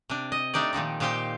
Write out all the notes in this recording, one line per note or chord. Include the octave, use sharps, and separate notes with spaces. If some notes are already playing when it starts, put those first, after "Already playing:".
C3 D4
D#5
A3 D4 D#4 G4 D5
A#2 D#3 F3 D#4
A#2 D#4 G4 C5 F5 G5